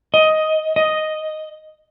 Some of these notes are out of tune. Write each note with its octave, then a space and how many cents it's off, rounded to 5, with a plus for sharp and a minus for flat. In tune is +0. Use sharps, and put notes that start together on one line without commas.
D#5 +10
D#5 +0